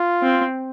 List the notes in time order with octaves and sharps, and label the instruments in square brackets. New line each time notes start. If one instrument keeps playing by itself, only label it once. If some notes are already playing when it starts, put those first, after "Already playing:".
Already playing: [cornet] F4
[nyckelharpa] C4